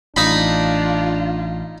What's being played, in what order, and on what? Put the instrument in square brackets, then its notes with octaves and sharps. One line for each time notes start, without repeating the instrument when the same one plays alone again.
[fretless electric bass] A1 [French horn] D4 [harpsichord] D#4 B5 [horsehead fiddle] F4